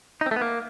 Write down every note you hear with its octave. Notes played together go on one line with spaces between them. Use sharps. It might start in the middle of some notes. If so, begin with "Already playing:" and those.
D#4
C4
A3
B3
A#3